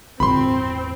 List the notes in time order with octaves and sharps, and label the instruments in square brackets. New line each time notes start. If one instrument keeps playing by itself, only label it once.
[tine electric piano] G1 [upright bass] E2 A2 [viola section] C4 [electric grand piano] B5 C6